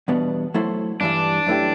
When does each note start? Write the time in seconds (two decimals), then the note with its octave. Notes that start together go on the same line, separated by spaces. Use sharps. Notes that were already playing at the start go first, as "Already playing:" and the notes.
0.08 E2 B2 G3 B3 D4
0.54 F#3 A3 E4 A4 C5
1.01 G2 E3 G3 D4
1.47 F#2 E3 A3 E4 G4